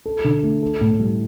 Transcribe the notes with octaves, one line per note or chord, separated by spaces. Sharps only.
A4
D3
A3
A4
A2
G3